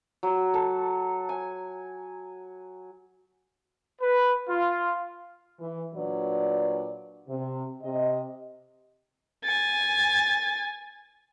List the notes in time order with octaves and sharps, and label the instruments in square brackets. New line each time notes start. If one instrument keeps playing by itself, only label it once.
[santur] F#3
A4
G#5
[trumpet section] B4
F4
[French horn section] E3
A#2 F#3 D4 B4 D5
C3
C3 D#5
[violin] G#5 A6